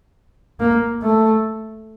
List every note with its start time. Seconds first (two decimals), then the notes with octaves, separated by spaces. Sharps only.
0.60 A#3
1.02 A3